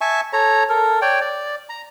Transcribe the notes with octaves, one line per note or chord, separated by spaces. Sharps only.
E5 G#5 A5 C#6
A4 C#5 A#5
A4 A#4
C#5 D5 G5
D5
A#5